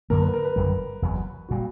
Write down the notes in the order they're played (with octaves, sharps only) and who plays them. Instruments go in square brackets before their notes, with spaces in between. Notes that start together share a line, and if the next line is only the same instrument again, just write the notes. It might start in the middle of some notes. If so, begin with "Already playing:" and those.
[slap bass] F#2 D3 F#3 A#3 [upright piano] A#4
[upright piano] B4
A#4
B4
[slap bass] G1 F#2 C#3 G3
F#1 E2 C#3 F#3
[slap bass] A#2 G3 [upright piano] F#4